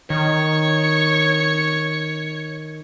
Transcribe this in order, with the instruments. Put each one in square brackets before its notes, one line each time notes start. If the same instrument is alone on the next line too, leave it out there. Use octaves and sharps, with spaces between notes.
[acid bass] D#3 [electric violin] C#5